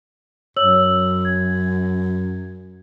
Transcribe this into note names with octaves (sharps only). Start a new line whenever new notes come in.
F#2 C#5 E6 F#7
G#6